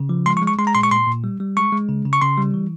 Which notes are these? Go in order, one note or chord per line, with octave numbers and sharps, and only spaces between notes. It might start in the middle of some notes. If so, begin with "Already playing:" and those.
Already playing: C#3
F3
G#3 C6
C#6
G#3
C#6
G#3 C6
A#5
A#2 C6
C#6
A#2 C6
A#2
G3
G3
G#3 C#6
G#3
C#3
C#3
C#6
C#3 C6
G3
E3